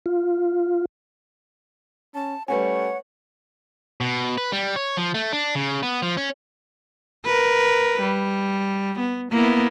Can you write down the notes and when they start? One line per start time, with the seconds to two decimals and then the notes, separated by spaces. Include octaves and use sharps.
0.06 F4
2.14 C#4 A5
2.48 G3 A3 C#4 B4 C#5 F#5 G#5
4.01 B2
4.38 B4
4.52 G3
4.76 C#5
4.97 F3
5.15 A3
5.33 D4
5.55 C#3
5.83 B3
6.02 F3
6.17 C#4
7.25 A#4 B4
8.02 G3
8.99 B3
9.31 A#3 B3 E4